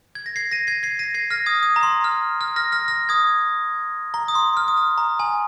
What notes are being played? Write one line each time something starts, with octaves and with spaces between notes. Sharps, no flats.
G#6
A#6
G#6 C7
A#6 D#7
G#6 C7
G#6 C7
A#6 D#7
G#6 C7
F6 A#6
D#6 G#6
D#6
A#5
C6
F6
F6
F6 A#6
F6 A#6
F6 A#6
D#6 G#6
A#5
D#6
C6
F6
D#6
F6
A#5
G#5